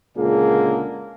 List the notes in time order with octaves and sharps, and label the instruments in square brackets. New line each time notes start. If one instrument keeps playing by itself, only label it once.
[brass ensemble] C#2 A#2 D3 A#3 G#4